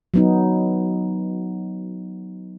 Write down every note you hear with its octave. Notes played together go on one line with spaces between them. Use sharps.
F#3 B3 D#4